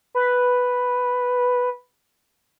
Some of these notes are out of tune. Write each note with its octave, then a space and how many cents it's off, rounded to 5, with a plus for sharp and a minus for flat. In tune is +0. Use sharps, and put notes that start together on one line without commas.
B4 +0